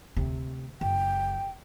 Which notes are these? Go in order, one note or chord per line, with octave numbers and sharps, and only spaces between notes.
D2 C3
F#1 G5